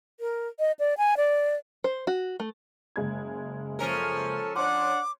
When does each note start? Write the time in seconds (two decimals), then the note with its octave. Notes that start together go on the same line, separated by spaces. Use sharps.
0.20 A#4
0.59 D#5
0.79 D5
0.97 G#5
1.17 D5
1.84 C5
2.07 F#4
2.40 A3
2.96 F#1 G#3 G#6
3.79 F3 C#4 A4 A#4
4.56 D4 C#5 F#5 C6 D6